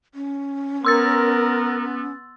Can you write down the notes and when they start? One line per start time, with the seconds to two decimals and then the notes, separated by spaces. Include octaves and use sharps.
0.14 C#4
0.85 B3 A#4 C6 E6 A6